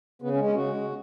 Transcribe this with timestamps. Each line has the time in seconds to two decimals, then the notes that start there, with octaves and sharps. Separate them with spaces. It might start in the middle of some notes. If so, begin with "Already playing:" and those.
0.22 C#3 B3
0.34 C#4
0.37 G#3
0.44 C#4
0.52 C#3 F#4
0.67 G#3
0.81 C#3